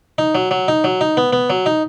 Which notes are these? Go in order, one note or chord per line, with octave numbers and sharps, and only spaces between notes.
D#4
F#3
F#3
D#4
F#3
D#4
B3
B3
F#3
D#4